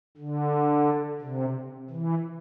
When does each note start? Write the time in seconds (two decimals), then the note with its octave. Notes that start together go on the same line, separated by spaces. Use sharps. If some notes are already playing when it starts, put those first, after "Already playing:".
0.18 D3
1.21 C3
1.90 E3